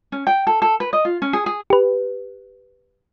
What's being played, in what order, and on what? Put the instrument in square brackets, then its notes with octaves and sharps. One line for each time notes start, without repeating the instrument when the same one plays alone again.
[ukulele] C#4
G5
A4
A4
B4
D#5
F4
C#4
G#4
G#4
[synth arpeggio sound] G4 B4